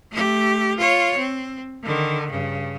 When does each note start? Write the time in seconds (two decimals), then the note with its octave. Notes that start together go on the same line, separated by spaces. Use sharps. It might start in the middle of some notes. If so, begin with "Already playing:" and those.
0.11 A3 G4
0.77 F4 C#5
1.17 C4
1.83 D3 D#3
2.30 G2 C#3